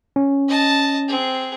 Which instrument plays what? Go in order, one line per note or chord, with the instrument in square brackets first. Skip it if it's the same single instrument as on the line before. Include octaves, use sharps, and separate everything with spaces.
[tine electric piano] C#4
[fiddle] D#5 A5
C4 G#4